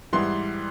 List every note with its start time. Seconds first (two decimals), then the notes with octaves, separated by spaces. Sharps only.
0.13 G#2 E3 G3 B3 C6